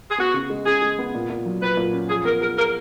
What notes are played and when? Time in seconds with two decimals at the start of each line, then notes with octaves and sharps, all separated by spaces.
0.10 G#4
0.18 B3 F#4
0.34 C#3
0.50 G#3
0.66 C#3 G#4
0.82 G#3
0.99 B3
1.15 A#2
1.30 A#2
1.46 F#3
1.61 A#2 B4
1.77 A#2
1.93 C#4
2.09 F3 G#4
2.25 B3 A#4
2.41 G#4 A#4
2.57 G#4 A#4